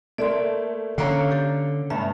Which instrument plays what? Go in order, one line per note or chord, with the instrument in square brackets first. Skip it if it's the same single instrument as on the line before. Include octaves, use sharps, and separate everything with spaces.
[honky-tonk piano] A3 A#3 [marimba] D5 E5 C6
[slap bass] D3 [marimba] A#3 C#4 C#5 [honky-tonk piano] F5 A#5
[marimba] G4 A4
[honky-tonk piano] G2 [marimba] G#3 A#3 E5